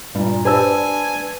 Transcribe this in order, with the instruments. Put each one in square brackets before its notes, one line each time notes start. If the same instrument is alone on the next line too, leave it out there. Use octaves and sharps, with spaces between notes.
[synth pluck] G2 G3 [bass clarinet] A#2
[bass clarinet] D4 [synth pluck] G4 C5 D5 [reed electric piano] B4 A5 E6 [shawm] G#5